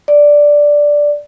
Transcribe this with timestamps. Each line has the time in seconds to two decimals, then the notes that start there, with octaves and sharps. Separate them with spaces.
0.08 D5